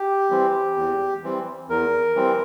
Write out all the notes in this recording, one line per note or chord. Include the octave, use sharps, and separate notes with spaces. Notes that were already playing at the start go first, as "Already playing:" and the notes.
Already playing: G4
E3 G3 C4
E2
E3 G3 C4
E2 A#4
E3 G3 C4